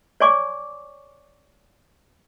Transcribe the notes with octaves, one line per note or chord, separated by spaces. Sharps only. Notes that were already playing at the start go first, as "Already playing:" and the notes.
C#5 D5 G#5 C#6 D6